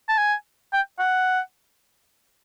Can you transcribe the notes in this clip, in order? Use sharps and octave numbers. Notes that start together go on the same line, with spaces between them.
A5
G#5
G5
F#5